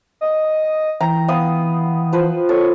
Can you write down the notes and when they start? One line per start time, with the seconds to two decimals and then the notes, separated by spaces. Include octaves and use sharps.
0.21 D#5
1.00 E3 G5 A#5
1.28 B3 F5 D#6
2.13 F3 B4 C5
2.49 A4 C#5